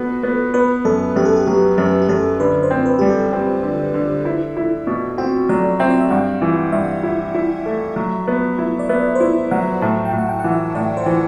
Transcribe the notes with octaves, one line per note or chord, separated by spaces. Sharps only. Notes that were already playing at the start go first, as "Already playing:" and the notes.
Already playing: B3 F#4 A4 B4
B3
B3 B4
F#2 A4
F#2 G4
A4
G4
F#3 G4
F#2 G4
G4
F#2 A4
D3 B4
C5
C4
B4
G3 G4
A4
C4
D3
D3
E4
E4
B2
C4 F#4
F#3 D5
C4 E5
D5
E5
G2 F#5
E3
G2 E5
E4
E4
A3
F#3
B3
E4
D5
B3 E5
C5
E4 D5
F#3 F#5
A2 A5
G5
A2
F#5
G5
E3 F#5
E5
A2 D5
C5
E3 D5